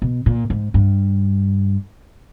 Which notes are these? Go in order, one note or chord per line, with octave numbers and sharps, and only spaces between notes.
B2
A#2
G#2
G2